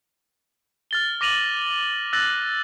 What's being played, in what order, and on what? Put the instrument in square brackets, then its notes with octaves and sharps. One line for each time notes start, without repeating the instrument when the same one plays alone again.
[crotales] F6 A6 G7
D6 A#6 D#7 F7 F#7
E6 F#6 A6 A#6 F#7